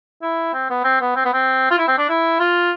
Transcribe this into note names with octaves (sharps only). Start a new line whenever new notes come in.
E4
C4
B3
C4
B3
C4
B3
C4
F4
E4
C4
D4
E4
F4